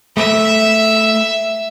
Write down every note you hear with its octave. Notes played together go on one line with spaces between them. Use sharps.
A3 E5